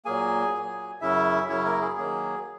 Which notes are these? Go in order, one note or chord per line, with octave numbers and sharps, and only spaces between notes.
A#2 F#3 A#3 G#4 G#5
A#2 F#3 A#3
F#2 C#3 F#3 C#4 E4 E5
F#2 C#3 F#3 C#4 E4 C#5
A#3 A#4
G#4
D#3 F#3 A#3 G#4